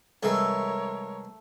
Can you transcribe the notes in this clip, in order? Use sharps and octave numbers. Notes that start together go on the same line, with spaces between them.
C2 E3 G#3 A3 A4 A#4 C#5